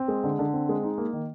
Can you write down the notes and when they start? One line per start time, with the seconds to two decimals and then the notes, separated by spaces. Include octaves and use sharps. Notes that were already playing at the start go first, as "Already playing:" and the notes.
Already playing: C4
0.08 G#3
0.24 D3
0.39 D3
0.54 C4
0.69 G#3
0.84 D#4
0.98 A#3
1.13 D#3